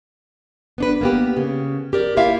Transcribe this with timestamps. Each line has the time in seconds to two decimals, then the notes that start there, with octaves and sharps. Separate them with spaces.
0.78 B3 D4 B4
1.01 A#3 B3 G4
1.37 C#3
1.93 G4 A#4 D5
2.17 A#3 E4 F4 G4 E5 F5